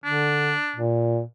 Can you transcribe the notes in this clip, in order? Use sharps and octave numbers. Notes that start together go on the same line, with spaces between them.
D3 D4
A#2